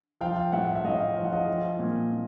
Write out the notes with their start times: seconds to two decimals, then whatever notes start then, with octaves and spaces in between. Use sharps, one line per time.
0.21 F3 F5 G5
0.52 A2 E5 F#5
0.75 E5
0.84 A2 D#5 F5
1.16 F3 F5
1.24 F#5
1.33 D#5 F5
1.48 F3
1.79 A#2
2.11 A#2